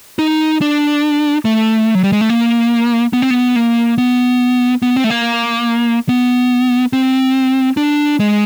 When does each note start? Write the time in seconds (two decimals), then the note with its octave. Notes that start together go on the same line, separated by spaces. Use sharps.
0.19 D#4
0.61 D4
1.45 A3
1.95 F#3
2.03 G3
2.12 G#3
2.21 A3
2.30 A#3
3.13 B3
3.22 C4
3.30 B3
3.56 A#3
3.98 B3
4.82 B3
4.96 C4
5.04 A3
5.10 A#3
6.09 B3
6.93 C4
7.77 D4
8.20 G#3